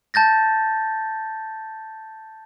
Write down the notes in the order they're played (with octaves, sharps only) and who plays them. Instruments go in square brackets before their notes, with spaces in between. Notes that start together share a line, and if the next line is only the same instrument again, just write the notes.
[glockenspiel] A5 G6 A6 A#6